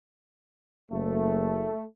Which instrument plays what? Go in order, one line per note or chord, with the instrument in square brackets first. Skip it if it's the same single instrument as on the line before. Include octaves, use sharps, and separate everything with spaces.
[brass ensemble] F#1 [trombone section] A3